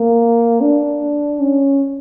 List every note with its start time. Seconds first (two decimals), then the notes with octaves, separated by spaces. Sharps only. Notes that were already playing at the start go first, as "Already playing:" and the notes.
Already playing: A#3
0.61 D4
1.40 C#4